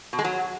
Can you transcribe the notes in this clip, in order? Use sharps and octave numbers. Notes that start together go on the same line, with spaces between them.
B2
G#3
F#3